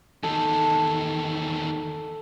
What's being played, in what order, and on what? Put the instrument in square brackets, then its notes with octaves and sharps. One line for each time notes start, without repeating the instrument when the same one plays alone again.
[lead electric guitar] E2 D#3 [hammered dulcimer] A4